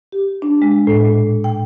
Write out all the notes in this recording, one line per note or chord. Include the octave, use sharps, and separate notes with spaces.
G4
D4
G#3
A2
A#2
G5